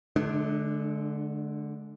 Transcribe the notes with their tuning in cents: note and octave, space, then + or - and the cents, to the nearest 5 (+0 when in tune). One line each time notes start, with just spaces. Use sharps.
D3 +0 G#3 +40 D4 +35